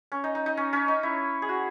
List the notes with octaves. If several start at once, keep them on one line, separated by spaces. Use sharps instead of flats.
C#4
D#4
D#4
D#4
C#4
C#4
D#4
E4
G#4
F#4